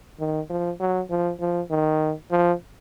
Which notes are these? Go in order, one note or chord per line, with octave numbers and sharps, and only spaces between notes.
D#3
F3
F#3
F3
F3
D#3
F3